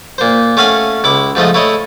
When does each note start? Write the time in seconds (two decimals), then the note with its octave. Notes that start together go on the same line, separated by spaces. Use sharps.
0.18 A#2 C5
0.57 A3 C#4 F5 F#5 G#5
1.04 C#2 E4 D6
1.35 G#2 F3 A3 D#5
1.54 A3 E4 C#5 D#5